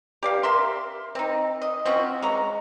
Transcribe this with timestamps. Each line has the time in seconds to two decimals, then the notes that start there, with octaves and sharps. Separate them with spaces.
0.23 G4 D5 F5
0.43 A#4 E5 C6
1.15 C4 D#4
1.62 D#5
1.85 C4 C#4 F4 F#4
2.22 G#3 C#5 A#5